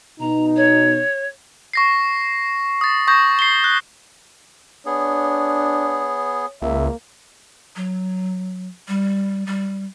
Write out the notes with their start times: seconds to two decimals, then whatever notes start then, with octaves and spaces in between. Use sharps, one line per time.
0.20 B2 D#4 A#5
0.56 C#5
1.73 C#6 A#6 C7
2.81 D#6 A6
3.08 C#6 D#6 G6 A#6
3.39 C7 G7
3.64 F#6
4.86 B3 D4 G#4 C#5
6.62 C#2 A#3 E5
7.76 F#3
8.88 G3
9.47 G3